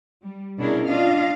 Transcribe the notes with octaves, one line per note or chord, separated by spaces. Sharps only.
G3
B2 C#4 D4 E4 G#4 A#4
D4 F4 D#5 F5